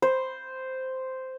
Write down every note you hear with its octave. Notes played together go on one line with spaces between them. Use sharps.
C5